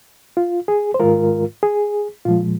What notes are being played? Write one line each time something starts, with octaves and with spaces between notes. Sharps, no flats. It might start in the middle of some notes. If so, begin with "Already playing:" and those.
F4
G#4
C5
G#2 D#3 G#3 F4 A#4
G#4
A#2 F3 G#3 F4